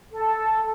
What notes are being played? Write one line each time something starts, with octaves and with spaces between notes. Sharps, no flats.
A4